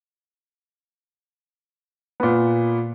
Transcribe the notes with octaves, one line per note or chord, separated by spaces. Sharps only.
A#2 B3